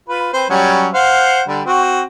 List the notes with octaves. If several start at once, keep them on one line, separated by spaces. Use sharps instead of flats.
F4 B4
C4 B4 C5
F#3 G3 C#4
C5 F5 F#5
D3 G3
C4 F#4